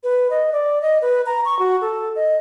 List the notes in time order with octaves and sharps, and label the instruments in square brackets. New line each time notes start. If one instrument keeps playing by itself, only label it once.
[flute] B4
D#5
D5
D#5
B4
A#5
C#6
F#4
A4
D#5